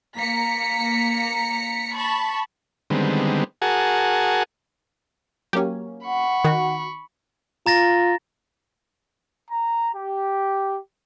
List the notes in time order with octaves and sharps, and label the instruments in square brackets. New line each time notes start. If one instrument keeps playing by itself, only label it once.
[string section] A#3 A#5 B6 C#7
A5 B5 C#6
[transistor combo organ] D3 D#3 G3 G#3 B3 C4
F#4 G#4 A#4 F#5 G#5 A5
[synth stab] F#3 A#3 C#4 [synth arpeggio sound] G4
[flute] F#5 [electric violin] B5 C#6
[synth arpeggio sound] D#3 [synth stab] F#4
[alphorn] F4 [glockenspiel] A#5 A6 A#6
[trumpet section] A#5
G4